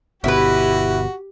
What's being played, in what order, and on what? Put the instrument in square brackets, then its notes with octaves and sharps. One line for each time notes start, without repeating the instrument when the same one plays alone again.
[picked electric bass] G1 B2 [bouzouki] E4 B4 [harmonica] F#4 [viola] G4